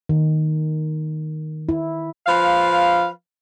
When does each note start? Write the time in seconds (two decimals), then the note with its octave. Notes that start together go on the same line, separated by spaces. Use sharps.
0.09 D#3
1.69 E4
2.26 F3 B4 F5